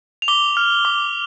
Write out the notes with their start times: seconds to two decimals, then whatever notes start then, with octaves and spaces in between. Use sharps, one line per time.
0.22 F7
0.28 D6 G7
0.57 F6
0.85 D6